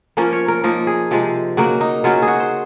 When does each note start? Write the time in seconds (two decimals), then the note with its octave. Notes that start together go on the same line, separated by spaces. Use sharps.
0.17 F3 A#3 C#4 A#4
0.33 C#5
0.48 A#4
0.64 F3 A#3 D#4 A#4
0.87 G#4
1.11 C3 F3 G#3
1.57 C#3 F#3 A#3 F#4
1.81 D#4
2.04 C#3 F#3 C#4 F4
2.22 G#4
2.28 F#4
2.40 C5